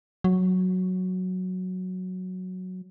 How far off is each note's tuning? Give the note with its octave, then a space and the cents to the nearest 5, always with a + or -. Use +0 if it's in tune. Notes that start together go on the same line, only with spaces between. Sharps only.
F#3 -5